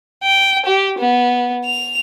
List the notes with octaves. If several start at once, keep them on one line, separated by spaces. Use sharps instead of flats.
G5
G4
B3
F7